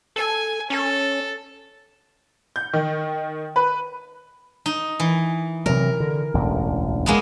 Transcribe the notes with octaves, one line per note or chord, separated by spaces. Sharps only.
A4 G#5
C#4 A4
G6
D#3
B4
D#4
E3
C3 E3 F#3 A#4
D3
E1 A1 D2
G#3 A#3 B3